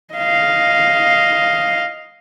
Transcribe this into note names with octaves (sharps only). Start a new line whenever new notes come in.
D#5 F5